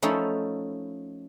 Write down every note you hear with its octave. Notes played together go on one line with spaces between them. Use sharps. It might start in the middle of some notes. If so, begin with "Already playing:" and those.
F3 A3 C#4 D#4 E4